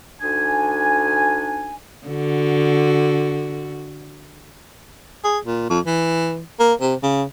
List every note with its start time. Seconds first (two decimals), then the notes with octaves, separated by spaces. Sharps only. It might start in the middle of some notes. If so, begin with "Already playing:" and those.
0.21 D2 D4 D#4 G#5
2.07 D3 F#4
5.24 G#4
5.46 A#2
5.70 F2
5.86 E3
6.60 A#3
6.82 C3
7.03 C#3